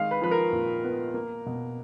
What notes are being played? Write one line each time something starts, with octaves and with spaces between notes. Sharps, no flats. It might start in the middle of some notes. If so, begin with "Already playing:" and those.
Already playing: D#3 G#3 F5
B4
F3 B4
A#4
A#2
B3
A#3
B2